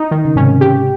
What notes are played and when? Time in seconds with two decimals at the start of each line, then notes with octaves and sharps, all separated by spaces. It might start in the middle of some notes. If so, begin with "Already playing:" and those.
Already playing: D#4
0.11 D#3
0.25 C#3
0.36 G#2 C3 C#4
0.61 G4